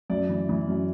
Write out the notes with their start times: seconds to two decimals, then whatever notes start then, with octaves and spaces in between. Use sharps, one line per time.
0.10 F#2 D5
0.29 E3
0.49 E3
0.68 F#2